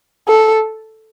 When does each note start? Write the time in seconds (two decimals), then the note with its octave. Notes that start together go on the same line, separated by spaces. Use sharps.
0.28 A4